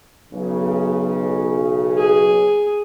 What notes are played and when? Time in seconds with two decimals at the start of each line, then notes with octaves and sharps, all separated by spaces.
0.33 B1 C#3
1.98 G#4